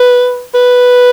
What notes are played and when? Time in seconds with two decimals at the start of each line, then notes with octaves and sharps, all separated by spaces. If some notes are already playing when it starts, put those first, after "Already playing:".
Already playing: B4
0.54 B4